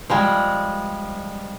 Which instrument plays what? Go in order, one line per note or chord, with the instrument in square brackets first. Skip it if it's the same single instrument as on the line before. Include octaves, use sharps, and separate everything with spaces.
[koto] F3 G3 G#3